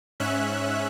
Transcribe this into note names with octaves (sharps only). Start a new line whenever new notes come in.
G#2 C#4 E5 F#6